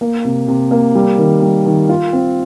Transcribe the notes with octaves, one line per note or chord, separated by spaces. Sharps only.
A#3
C3
C3
A#3
G3
D#3
G3
D#3
F4
C4